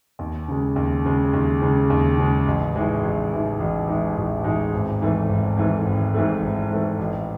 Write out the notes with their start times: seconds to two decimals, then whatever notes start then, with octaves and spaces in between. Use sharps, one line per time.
0.19 D#2
0.48 C#3 G#3
0.76 D#2
1.05 C#3 G#3
1.33 D#2
1.62 C#3 G#3
1.90 D#2
2.18 C#3 G#3
2.46 A1
2.74 A2 E3 G#3 D#4
3.03 A1
3.32 A2 E3 G#3 D#4
3.60 A1
3.88 A2 E3 G#3 D#4
4.16 A1
4.44 A2 E3 G#3 D#4
4.73 G#1
5.01 G#2 E3 A3
5.29 G#1
5.57 G#2 E3 A3
5.86 G#1
6.14 G#2 E3 A3
6.42 G#1
6.70 G#2 E3 A3
6.99 A1